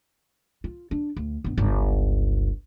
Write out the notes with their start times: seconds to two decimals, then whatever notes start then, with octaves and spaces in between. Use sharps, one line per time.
0.64 F4
0.91 D4
1.17 D2
1.44 G2 B3
1.57 G1 C#2